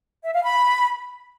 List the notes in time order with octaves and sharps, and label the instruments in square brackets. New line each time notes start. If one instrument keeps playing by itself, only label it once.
[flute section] E5
F5
B5